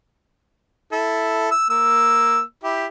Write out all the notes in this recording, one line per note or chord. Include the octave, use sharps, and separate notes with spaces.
E4 A4
E6
A#3 E6
E4 G4